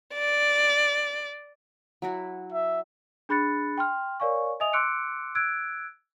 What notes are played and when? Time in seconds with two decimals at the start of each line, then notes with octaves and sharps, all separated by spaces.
0.15 D5
2.02 F#3 E4 F#4
2.53 E5
3.29 D4 G#4 B5 F#6 A6 C#7
3.78 G5 C6 F6
4.20 A#4 C#5 D5 F5 G#5 C#6
4.60 D#5 E5 G#5 D#6 F7
4.73 C6 D6 E6 F#6 C#7 D7
5.35 E6 F#6 G#6 D7